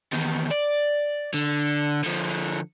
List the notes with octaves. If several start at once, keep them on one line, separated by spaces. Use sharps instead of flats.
E2 D#3
D5
D3
D3 F3